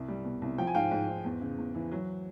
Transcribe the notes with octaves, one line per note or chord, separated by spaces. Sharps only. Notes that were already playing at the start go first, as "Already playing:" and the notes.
Already playing: C2
G3
B2
C2
F3 G5
G#5
G#2 F5 G5
G#2
G#2
E2
C#3
E2
E3
F#3